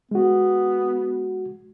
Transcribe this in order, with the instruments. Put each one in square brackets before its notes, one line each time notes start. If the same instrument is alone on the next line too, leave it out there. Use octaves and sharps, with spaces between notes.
[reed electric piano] G#3 F#4 [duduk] B3